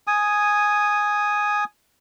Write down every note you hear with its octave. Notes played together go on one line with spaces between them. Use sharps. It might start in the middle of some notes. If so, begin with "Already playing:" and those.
G#5 D#6